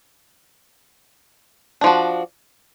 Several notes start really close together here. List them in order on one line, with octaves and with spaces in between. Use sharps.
D4 F3 F#4